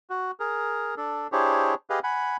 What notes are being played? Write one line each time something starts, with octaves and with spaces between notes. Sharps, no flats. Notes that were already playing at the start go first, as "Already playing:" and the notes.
F#4
G#4 A#4
D4 A4
D4 E4 G4 G#4 C5 C#5
G4 G#4 B4 D#5 F5
F#5 G#5 B5